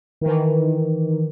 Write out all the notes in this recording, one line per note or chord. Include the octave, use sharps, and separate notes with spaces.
D#3 E3